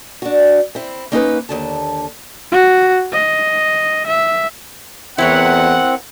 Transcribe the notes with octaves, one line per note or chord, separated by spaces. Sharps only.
D4 F#4
C4 E4
A#3 C#4 D#4 E4 A#4 B4
D#2 D3 A5
F#4
D#5
E5
E2 C4 E4 A#4 C#5 F#5